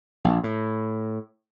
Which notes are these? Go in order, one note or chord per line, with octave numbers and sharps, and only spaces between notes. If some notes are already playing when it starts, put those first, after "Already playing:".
A#1
A2